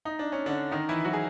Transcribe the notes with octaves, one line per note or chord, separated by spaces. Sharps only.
D#4
D4
C#4
D3 D4
D#3 D#4
E3 E4
F#3 F#4
G#4